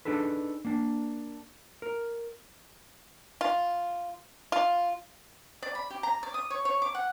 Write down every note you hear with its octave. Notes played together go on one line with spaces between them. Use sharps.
D4 D#4 G#4 A4 B4
A#3 D4
A#4
F4
F4
D5
B5
G4
A#5
D5
D#6
C#5
C#5
D6
F#5